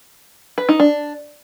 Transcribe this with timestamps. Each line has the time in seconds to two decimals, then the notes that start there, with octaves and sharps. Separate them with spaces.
0.58 B4
0.69 D#4
0.80 D4